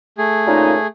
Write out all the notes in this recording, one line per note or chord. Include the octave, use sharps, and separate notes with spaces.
A3 G#4
A#2 C#3 D#4